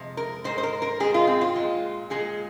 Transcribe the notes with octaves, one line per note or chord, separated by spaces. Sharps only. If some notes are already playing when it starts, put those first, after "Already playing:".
Already playing: F2 C3 G#3
A#4
G#2 G#3 C5
C5
A#4
A#4
G#2 G#3 G#4
F4
C4
F4
A#2 G#3
A#2 G#3 G#4